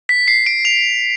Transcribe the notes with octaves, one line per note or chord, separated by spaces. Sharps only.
B6
C7
D7
F7